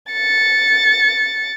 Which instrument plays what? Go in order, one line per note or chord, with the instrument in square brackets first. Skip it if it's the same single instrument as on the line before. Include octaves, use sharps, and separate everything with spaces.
[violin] A6 C#7